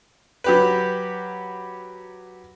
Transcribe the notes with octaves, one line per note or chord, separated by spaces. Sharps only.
F#3 G4 B4